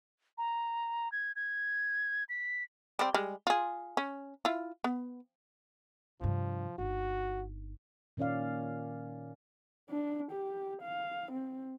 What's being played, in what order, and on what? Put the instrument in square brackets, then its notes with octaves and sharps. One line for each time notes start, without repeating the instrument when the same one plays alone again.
[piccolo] A#5
G#6
G#6
B6
[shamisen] G3 C4
G3 G#3
F4 G#4
C#4
E4 F4
B3
[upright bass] G2 C3 [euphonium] F3
[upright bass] G1 D#4 [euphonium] F#4
[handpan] A#2 D#3 C#4 D5 F5
[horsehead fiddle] D4
G4
F5
C4